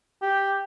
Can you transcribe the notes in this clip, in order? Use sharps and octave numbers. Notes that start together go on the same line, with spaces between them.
G4